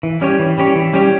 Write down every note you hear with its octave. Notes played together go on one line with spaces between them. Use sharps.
E3
G3 C#4 G4 C#5
E3
G3 C#4 G4 C#5
E3
G3 C#4 G4 C#5